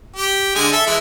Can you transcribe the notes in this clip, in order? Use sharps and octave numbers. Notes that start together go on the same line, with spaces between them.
G4
D3 G#3 G#5
A4 E5
E3 G#3 E4